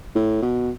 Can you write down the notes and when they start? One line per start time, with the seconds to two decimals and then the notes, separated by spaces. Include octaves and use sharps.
0.15 A2
0.42 B2